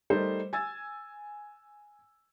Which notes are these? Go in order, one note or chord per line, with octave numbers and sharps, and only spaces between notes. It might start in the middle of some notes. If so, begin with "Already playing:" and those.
G3 A3 D#4 A#4 C5
G#5 E6 G#6 A6